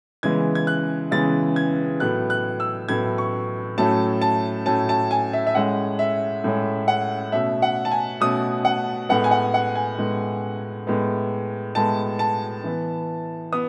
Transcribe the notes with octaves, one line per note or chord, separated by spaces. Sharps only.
C#3 E3 G#3 B3 G#6
G#6
F#6
C#3 E3 G#3 B3 A6
G#6
A2 F#3 B3 F#6
F#6
E6
A2 F#3 B3 G#6
C#6
A2 F#3 A3 C#4 A5
A5
A2 F#3 A3 C#4 A5
A5
G#5
E5
E5
A2 G#3 C#4 F#5
E5
A2 G#3 C#4
F#5
B2 A3 C#4 E5
F#5
A5
G#5
B2 A3 C#4 D#6
F#5
A2 G#3 B3 F#5
G#5
F#5
F#5
G#5
A2 G#3 B3
A2 G#3 B3
A2 G#3 B3 A5
A5
E3 B3
B3 D#6